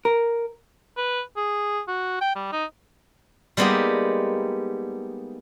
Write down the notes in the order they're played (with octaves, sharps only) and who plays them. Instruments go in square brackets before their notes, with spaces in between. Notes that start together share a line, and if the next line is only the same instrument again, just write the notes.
[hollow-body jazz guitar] A#4
[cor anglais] B4
G#4
F#4
G5
G3
D#4
[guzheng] G3 G#3 A#3 B3 D#4 G4